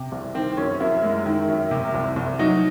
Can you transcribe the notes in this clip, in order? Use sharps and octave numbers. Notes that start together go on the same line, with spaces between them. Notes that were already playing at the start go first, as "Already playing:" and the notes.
Already playing: C3
C2
D#3 C4
F#2 C#4
F#2 E4
G#3
D#3
F#2
C3
C2
C2
F#3 D#4